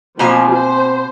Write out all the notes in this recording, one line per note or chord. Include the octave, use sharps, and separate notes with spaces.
B2 F3 A#3 C4 G#5
C5